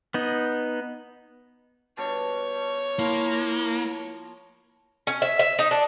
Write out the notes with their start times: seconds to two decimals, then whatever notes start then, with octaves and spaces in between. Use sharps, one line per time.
0.14 B3 D#4
1.97 B2 G3 D4 C#5
2.99 F3 A#3 E4
5.07 C#4
5.22 E5
5.39 E5
5.59 D#4
5.71 D4